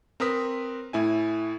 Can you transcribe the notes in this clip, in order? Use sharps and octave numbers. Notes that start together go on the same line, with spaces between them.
C4 A#4 B4 D#6 B6
A2 E4 G#5